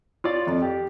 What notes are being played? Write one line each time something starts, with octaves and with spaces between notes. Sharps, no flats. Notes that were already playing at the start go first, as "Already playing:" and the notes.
F4 C#5 D5
F2
G4